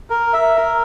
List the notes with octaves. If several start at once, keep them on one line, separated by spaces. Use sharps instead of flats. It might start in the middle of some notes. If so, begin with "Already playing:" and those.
A#4
E5
A#4